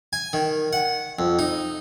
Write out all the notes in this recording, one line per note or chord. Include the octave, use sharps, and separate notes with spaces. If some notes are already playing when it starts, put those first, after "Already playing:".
G#5
D#3
F#5
F2
D#4